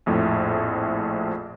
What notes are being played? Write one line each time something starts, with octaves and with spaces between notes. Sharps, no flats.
A#1 F2 A2